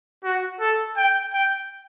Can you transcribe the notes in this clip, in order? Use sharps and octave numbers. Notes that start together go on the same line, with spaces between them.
F#4
A4
G5
G5